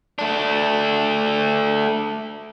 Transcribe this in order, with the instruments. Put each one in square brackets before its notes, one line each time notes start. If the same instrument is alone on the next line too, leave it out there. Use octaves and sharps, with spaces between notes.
[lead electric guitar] A3 D4